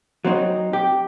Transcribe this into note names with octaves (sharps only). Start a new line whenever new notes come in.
F#3 C4 D4 D#4
G4